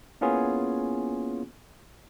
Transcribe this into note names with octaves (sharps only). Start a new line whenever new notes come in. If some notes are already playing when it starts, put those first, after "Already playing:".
A#3 B3 C#4 E4 F4 G#4